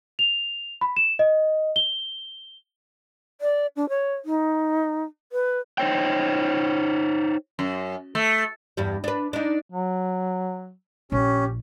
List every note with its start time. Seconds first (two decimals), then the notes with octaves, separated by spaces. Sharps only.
0.19 F7
0.81 B5
0.97 E7
1.19 D#5
1.76 G7
3.41 D5
3.76 D4
3.89 C#5
4.25 D#4
5.32 B4
5.78 D#4 C5 C#5 G5
7.59 F#2
8.15 A3
8.77 E2 G2 G3
9.04 D4 B4
9.33 D4 D#4
9.70 F#3
11.12 A#1 C#4 G4